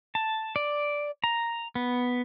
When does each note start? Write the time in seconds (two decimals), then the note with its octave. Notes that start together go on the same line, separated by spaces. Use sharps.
0.15 A5
0.56 D5
1.24 A#5
1.75 B3